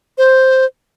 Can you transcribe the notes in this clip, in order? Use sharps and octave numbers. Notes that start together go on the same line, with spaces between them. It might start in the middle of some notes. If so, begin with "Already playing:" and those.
C5